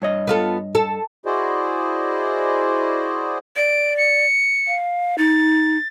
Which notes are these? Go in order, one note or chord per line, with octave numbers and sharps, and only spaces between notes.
G2 C#5 D#5
B3 F4 A4
A4
E4 F#4 G#4 C5 D5 D#5
D5 D7
C#7
F5
D#4 A6